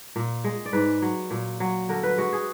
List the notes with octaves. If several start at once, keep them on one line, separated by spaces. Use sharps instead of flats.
A#2
G#3
D5
G#2 B4
F#3
A#2
F#3
D3 A#4
B4
G#3 F#4
G#4